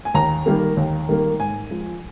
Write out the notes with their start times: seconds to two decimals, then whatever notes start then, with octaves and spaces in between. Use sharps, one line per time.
0.05 G#5
0.14 D#2 A#5
0.46 D#3 G3 A#3
0.77 D#2
1.09 D#3 G3 A#3
1.39 G#2 G#5
1.70 F3 G#3